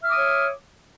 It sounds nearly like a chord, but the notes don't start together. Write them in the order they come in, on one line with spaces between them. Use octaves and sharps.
E5 F6 D6 D#6 C#5